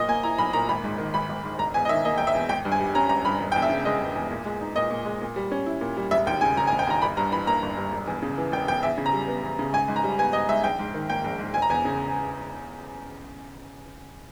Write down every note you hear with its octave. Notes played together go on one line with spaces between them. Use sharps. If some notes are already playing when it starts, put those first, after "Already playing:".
Already playing: B1 A#2 D#5
A#3 G#5
E4 A#5
B1 B5
A#2 A#5
G#1 B5
G#2
D#3
G#1 B5
G#1
G#2
E1 A#5
E2 G#5
D#5
D#3 E5
A#3 D#5
E1 G5
E5
E2
G#1 G5
G2
G#5
G3
C#4 A#5
G#1 A#5
G2 B5
E1
E2 G5
E5
C#3
G#3 D#5
E1
E2
A#2
G#3
D#4
A#2 D#5
A#2
G#3
A#2
G3
C#4
E4
A#2
G3
E1 E5
D#2 G5
C#3 G#5
E1 A#5
G#5
E1
G5
D#2 A#5
G1 B5
G2 A#5
E3 B5
A#3 A#5
G1
G2
E1
E2
C#3
E3
E1 G5
E2 G5
E2 E5
C#3
A#5
G3
B3
E2
C#3
G#1 G#5
G#2
A#5
G3
B3 G#5
G#1 D#5
G#2 E5
A#1 G5
G#2
D#3
A#3 G5
A#1
G#2
E1 G#5
A#5
E2 G#5
C#3